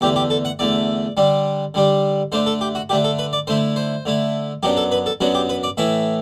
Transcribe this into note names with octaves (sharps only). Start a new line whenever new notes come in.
E2 D3 A3 G4
G4
A4
F#5
E2 D3 A3 D5
D3 G3 D4
D3 G3 D4
D3 A3 D4 C5
A4
G4
F#4
D3 A3 D4 G4
A4
B4
D5
D3 A3 E4 C5
C5
D3 A3 E4
F#2 F#3 B3 D4 G4
A4
B4
A4
F#2 F#3 B3 D4 F#4
G4
B4
D5
A2 E3 A3 E5